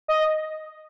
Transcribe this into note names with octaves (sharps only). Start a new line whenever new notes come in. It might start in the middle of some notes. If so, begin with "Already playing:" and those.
D#5